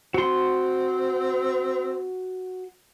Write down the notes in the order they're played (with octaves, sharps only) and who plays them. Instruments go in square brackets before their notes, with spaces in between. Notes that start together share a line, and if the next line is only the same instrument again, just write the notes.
[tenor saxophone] C4 [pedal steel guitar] F#4 C6